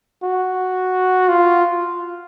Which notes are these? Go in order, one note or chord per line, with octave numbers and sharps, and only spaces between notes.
F#4
F4